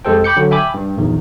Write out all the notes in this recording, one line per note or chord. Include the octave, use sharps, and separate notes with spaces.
F2 G#3 G4 A4 C5 G5
G5 B5 D6 G6 C#7
D3 F#3
E5 G5 G#5 B5 D6
G2
A#1 E2 D#3